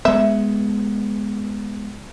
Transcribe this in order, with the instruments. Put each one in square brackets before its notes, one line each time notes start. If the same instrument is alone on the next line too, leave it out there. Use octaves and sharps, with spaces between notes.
[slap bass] G#3 B3 [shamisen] E5